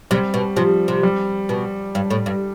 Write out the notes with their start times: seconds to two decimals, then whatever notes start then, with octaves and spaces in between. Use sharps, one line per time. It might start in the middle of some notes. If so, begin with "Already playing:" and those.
0.11 C3 G3
0.34 B2
0.57 C3 F3
0.88 C3
1.03 G3
1.49 B2
1.95 G2
2.10 A2
2.26 G2